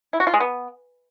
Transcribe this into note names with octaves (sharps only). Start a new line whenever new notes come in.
E4
F#4
F4
G#3
B3